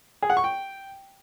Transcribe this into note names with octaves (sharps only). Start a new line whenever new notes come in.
G#4
F#5
C#6
G5